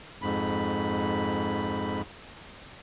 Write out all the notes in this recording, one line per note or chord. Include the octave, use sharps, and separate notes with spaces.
F2 G#2 B5